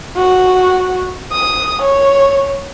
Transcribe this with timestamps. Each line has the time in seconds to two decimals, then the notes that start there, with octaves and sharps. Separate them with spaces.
0.16 F#4
1.32 D#6
1.82 C#5